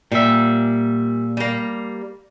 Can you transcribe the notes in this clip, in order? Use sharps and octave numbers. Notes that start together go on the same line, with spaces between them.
A#2 G3 E5
G3 A#3